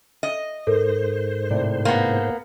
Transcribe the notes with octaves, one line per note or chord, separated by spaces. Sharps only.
D#5
G#2 A4 A#4 C5
A2 C3 D5
A#3 B3